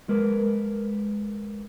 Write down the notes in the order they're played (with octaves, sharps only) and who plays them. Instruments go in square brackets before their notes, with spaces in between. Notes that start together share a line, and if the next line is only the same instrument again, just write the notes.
[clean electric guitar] G#3 A#4 B4